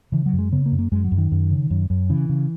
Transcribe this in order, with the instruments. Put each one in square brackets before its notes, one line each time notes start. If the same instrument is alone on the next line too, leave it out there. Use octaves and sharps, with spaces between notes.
[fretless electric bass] C#3 E3
F#3
F#2
G#3
C#3 B3
A#3
F#2
A#3
F#2 G#3
F#3
F#2
D#3
F#2
C#3
F#2
F#2
C#3 E3
C#3